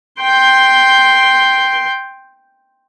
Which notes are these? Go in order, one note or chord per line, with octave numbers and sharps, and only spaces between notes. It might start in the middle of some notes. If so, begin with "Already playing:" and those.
G5 C6